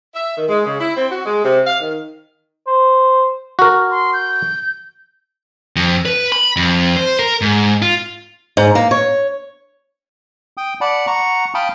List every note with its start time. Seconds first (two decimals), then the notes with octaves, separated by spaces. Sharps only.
0.15 E5
0.37 D#3
0.49 G#3
0.65 C#3
0.80 E4
0.96 C4
1.10 F#4
1.25 G#3
1.45 C3
1.66 F5
1.80 D#3
2.67 C5
3.59 F#4 A#4
3.91 C6
4.13 G6
5.76 F2
6.06 B4
6.32 B5
6.56 F2
6.97 C5
7.19 A#4
7.41 G#2
7.82 F4
8.57 G#2
8.75 A#3
8.91 C#5
10.57 G5 D#6
10.81 D5 F#5 A5 B5
11.07 F#5 A#5 C#6
11.55 F5 G5 A5 B5 D#6